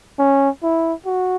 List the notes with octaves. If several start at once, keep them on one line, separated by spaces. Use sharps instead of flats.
C#4
E4
F#4